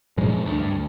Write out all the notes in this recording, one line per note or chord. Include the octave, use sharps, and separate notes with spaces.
F#2 A#2 F3 G#3
D2
G2
D2